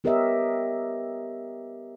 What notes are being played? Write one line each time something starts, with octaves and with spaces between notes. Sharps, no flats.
B3 G4 A#4 C#5 D#5 E5